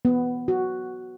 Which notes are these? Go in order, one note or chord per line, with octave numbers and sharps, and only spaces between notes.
B3
F#4